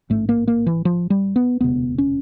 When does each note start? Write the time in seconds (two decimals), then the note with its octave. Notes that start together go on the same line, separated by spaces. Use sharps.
0.10 A1 G#2 A3
0.29 A#3
0.47 A#3
0.66 E3
0.85 F3
1.10 G3
1.36 B3
1.60 E1 D2 C3 B3
1.98 C#4